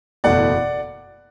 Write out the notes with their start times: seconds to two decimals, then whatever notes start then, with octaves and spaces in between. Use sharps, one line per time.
0.24 F#1 E2 B2 A3 D5 F#5